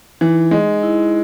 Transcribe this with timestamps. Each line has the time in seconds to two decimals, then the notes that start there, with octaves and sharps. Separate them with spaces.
0.21 E3 D#4
0.51 G#3 D#4
0.83 E4